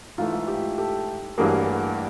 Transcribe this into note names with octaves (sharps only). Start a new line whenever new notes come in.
G#2 E3 A3 F4
F4
F4 G4
G4 A4
A1 G2 E3 G3 A#3 F#4 G#4